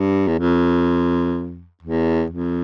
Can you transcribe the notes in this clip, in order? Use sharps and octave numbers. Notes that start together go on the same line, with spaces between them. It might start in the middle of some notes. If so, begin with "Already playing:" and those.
Already playing: G2
E2
F2
E2
F2